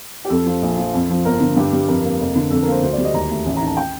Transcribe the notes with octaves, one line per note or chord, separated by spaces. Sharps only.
G4
F2 A4
F3
A#1
F3
F2
F3
G1 A#4
D3
G2 G4
G3
F2 A#4
A#3
F1
D3
F2 A4
A#4
A#3 C5
D2 C5
D5
G3
D#5
D#2 A#5
A3
A1
A#5
D#3
A5
G5